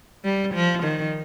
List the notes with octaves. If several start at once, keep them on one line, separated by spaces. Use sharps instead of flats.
G3
F3
D#3